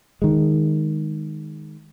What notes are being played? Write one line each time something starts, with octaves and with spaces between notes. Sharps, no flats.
D#3 G#3